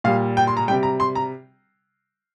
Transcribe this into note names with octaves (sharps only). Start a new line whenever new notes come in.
A#2 G3 F5
G5
C6
A#5
C3 G3 G5
A#5
C6
A#5